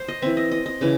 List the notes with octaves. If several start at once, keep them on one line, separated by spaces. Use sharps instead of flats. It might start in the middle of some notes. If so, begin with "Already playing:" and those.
Already playing: C5
D#5
E3 C4 E5
D#5
D#5
D#5
C#3 E3